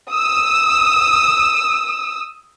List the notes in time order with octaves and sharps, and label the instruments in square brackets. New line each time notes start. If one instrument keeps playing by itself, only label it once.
[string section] D#6 E6